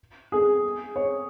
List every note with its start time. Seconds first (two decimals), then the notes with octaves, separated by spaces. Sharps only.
0.32 G#4
0.96 C#5